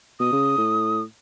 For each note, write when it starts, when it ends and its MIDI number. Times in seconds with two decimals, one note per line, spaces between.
0.20 0.29 47
0.20 1.02 87
0.32 0.54 49
0.58 1.03 45